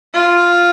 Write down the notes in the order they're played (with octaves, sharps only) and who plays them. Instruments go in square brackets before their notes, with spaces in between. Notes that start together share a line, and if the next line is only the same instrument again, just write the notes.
[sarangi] F4